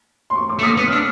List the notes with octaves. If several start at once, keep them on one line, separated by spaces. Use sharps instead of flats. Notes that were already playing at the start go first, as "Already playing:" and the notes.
C6
C#6
D6
A3
A#3 D#6
B3
F6
D4 E6